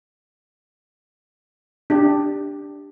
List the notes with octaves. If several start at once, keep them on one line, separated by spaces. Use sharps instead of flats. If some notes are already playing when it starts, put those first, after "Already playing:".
D4 G4